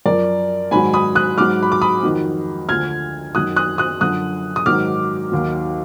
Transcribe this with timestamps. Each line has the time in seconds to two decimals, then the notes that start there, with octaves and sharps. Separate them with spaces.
0.06 F#2 F3 A#4 D5
0.71 G#2 D#3 F#3 G#5 B5
0.93 B5 D#6
1.15 D#6 F#6
1.37 G#2 F#3 D6 F6
1.63 B5
1.72 D6
1.82 B5 D#6
2.03 F2 D#3 F#3
2.69 D2 D3 F3 F6 G#6
3.35 F#2 D#3 F#3 D#6 F#6
3.56 D#6 F#6
3.78 D#6 F#6
4.01 F#2 D3 F3 D#6 F#6
4.56 D#6
4.66 G#2 D#3 F#3 D6 F6
5.32 D#2 D#3 F#3